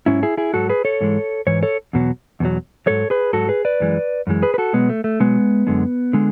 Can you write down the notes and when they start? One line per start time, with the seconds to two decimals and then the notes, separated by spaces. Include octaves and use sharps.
0.06 G#2 F#3 C#4 E4
0.23 E4 G#4
0.37 E4 G#4
0.54 G#2 F#3 F#4 A4
0.69 G#4 B4
0.85 A4 C#5
1.01 G#2 E3 G#3
1.47 G#2 E3 C#5
1.63 A4 C#5
1.93 E2 B2 F#3
2.40 E2 B2 F#3
2.86 G#2 F#3 A4 C#5
3.10 G#4 B4
3.33 G#2 F#3 F#4 A4
3.49 G#4 B4
3.65 B4 D5
3.80 F#2 E3 G#3
4.27 F#2 E3 G#3
4.42 G#4 B4
4.54 B4
4.58 F#4 A4
4.73 B2 F#3 G#3 B3
4.89 A3
5.04 A3
5.20 B2 F#3 G#3 B3
5.67 F#2 D3 G#3
6.13 D3 G#3